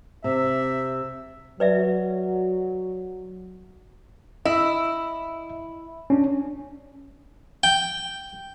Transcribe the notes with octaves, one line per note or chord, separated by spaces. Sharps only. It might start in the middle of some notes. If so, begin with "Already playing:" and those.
C3 E5
F#3 B4 D5 E5
E4 D#5 E5
C#4 D4
G5